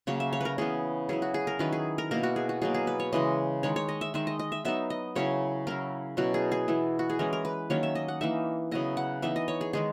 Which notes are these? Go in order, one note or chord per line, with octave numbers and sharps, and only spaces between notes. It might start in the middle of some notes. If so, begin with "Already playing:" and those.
C#3 F#3 A#3 C#5
E5
C#5
A#4 B4
C#3 E3 B3 G#4
F#3 C#4 E4 G#4
F#4
G#4
A#4
D#3 F#3 C#4 E4 B4
G#4
A#4
B2 A#3 E4 A#4
F#4
G#4
F#4
B2 F#3 A#3 G#4
G#4
B4
C#5
C#3 E3 G#3 D#5
D#3 G#3 D#4 C#5
C#5
D#5
E5
D#3 G#3 D#4 E5
D#5
D#5
E5
F#3 B3 D#4 E5
D#5
C#3 F#3 C#4 E4 C#5
F#3 C#4 E4 A#4
B2 F#3 C#4 E4 F#4
G#4
G#4
E3 B3 E4
F#4
G#4
E3 G#3 C#4 A#4
A#4
B4
D#3 F#3 A#3 C#4 C#5
E5
D#5
F#5
E3 A#3 D#4 E5
C#3 F#3 B3 E4 D#5
F#5
E3 B3 D#4 E5
D#5
C#5
G#4
D#3 G#3 D#4 G#4